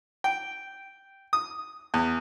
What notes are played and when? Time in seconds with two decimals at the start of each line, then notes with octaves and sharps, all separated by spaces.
0.24 G5
1.33 D#6
1.94 E2